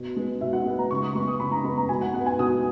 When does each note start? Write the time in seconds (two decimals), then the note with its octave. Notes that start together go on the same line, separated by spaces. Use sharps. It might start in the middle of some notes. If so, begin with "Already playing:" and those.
Already playing: B2
0.16 G#3 B3
0.41 B2 E5
0.53 F#5
0.65 G#3 B3
0.79 A#5
0.91 C#3 C#6
1.03 D#6
1.15 G#3 B3 C#6
1.28 D#6
1.39 C#3 B5
1.52 A#5
1.64 G#3 B3 B5
1.77 A#5
1.89 B2 G#5
2.01 F#5
2.14 G#3 F#5
2.19 B3
2.26 G#5
2.38 B2 D#6